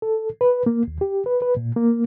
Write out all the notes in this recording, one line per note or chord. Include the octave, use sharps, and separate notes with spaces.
A4
B4
A#3
D#2
G4
B4
B4
A#2
A#3